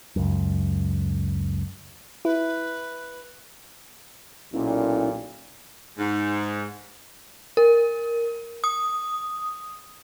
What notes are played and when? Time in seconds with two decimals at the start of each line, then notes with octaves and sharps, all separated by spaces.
0.16 C#2 F#2
2.25 E4 B4
4.54 B1 A#2 C#4 E4
5.98 G#2
7.57 A#4
8.64 D#6